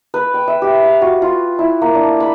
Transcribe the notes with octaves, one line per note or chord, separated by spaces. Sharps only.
B4
G5
E5
G4
F5
F#4
F4
E4
A#3
D4
B5